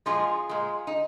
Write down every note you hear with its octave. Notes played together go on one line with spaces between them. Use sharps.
A#2 F3 G#3 F4 G#4
A#2 G#3
D#4